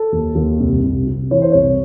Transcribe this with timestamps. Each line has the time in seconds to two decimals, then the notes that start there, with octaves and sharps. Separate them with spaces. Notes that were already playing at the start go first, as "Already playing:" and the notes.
Already playing: A4
0.12 D#2
0.35 D#2
0.60 C2
0.83 C2
1.07 C3
1.31 E3 C#5
1.42 C5
1.52 C2 C#5